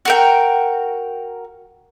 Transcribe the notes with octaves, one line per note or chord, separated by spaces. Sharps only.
F#4 A#4 G5